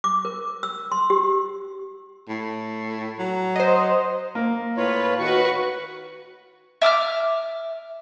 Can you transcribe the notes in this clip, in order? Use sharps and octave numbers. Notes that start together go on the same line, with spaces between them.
D6
A#4
E6
C6
G4
A2
F#3
C5 D#5
A#3
A2 F4 B4 C#5
D#3 F#4 B4 C#6
E5 D6 E6 F6